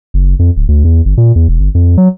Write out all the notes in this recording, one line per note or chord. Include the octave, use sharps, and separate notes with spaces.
F#1
F2
D1
D2
E2
G1
A#2
E2
E1
G1
F2
F#3